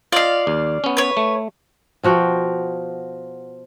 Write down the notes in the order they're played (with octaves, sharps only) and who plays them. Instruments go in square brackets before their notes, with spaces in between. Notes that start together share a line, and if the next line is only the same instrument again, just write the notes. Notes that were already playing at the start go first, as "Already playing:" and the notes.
[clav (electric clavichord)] F4 D#5 [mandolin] D5 F5
[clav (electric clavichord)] D#2
B3 C#4
[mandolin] B4 C#5
[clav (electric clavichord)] A3
[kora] B2 F3 F#4 G5